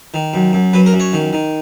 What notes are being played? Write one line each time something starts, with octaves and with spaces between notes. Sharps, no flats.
D#3
F#2
F#2
F#3 B4
A#4
F#2
C#5
D#3
D#3